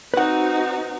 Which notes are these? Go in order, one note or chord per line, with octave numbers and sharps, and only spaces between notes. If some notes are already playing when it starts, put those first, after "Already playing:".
C4 D#4 F#4 B4 F#5